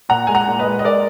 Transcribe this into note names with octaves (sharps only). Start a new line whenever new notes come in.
A#2 F#5 A#5
G#3 G#5
F#5 A#5
A#2
B4 D#5
G#3
D#5
G#3 A#4 D5